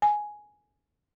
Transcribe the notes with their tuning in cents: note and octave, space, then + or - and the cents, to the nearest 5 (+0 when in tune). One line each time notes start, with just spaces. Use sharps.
G#5 +5